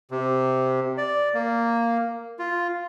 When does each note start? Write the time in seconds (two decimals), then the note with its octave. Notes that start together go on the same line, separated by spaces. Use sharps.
0.11 C3
0.98 D5
1.34 A#3
2.39 F4